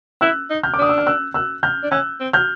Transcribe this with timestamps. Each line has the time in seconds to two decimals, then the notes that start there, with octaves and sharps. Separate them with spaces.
0.21 E4 E6 F#6
0.50 D#4
0.63 F6 G6
0.74 D6
0.79 D4 D#6
0.89 E6
0.98 F6
1.07 E6 F#6
1.34 E6 F#6
1.63 F6 G6
1.83 D4
1.91 C#4 E6 F#6
2.20 C4
2.33 F6 G6